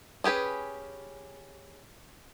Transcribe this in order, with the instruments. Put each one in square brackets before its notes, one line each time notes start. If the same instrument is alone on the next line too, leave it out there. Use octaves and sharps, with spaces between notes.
[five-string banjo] C#4 G4 G#4 B4